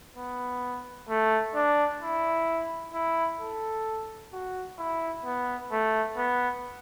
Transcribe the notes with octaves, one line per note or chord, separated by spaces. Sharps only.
B3
A3
D4
E4
E4
A4
F#4
E4
B3
A3
B3